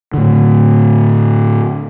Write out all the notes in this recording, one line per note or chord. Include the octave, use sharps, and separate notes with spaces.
A2 D3